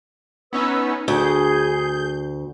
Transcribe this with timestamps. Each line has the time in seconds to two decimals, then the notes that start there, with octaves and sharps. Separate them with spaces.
0.53 B3 C#4 D#4 B4 E6
1.08 D2 G#4 G6